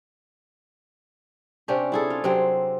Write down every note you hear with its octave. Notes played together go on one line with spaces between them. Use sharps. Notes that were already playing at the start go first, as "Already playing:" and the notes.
C3 C#4 D4 G4
E4 G#4 A4
F4
C3 F#3 C4